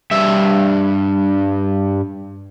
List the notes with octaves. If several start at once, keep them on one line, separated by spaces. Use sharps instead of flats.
G2 E5